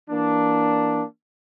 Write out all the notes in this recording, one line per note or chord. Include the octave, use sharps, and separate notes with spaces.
E3 A#3 D4